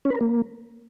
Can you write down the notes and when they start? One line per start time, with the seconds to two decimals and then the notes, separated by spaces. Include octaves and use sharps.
0.05 C#4
0.10 B4
0.15 A#4
0.21 A#3